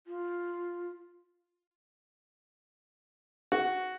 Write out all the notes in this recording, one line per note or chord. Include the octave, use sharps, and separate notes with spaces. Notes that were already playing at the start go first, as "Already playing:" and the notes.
F4
F#4